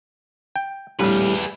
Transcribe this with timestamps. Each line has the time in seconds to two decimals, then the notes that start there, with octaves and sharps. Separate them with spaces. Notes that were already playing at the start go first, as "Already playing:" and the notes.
0.56 G5
0.99 A#1 A2 G3 G#4 B4